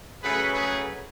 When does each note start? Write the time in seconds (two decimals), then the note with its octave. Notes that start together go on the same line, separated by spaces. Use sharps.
0.23 C#3 F#3 A3 G#4 B4
0.52 G#4 B4